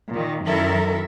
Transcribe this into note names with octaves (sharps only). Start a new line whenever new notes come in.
A#2 D#3
F#2 D#3 E4 A4 A#4 E5